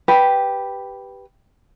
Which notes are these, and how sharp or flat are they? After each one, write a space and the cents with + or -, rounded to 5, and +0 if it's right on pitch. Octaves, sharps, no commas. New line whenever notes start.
G4 +0 B4 +0